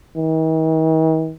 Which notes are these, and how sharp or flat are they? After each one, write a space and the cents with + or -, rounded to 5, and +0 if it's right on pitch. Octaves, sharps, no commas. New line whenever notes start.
D#3 +45